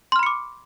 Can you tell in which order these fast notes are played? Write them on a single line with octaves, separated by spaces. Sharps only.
C6 F6 B5 C#7 D6